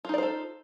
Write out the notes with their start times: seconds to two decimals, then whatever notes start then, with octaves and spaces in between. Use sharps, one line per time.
0.05 F4
0.09 D#4
0.14 D5
0.18 C5
0.23 A4